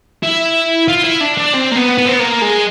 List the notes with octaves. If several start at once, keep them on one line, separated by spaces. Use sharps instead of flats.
E4
F4
E4
D4
D4
C4
A#3
B3
B3
C4
B3
A#3
G#3